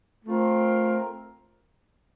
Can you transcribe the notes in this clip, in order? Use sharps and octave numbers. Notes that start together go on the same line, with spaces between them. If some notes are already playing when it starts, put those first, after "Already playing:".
A3 C4 F4 A#4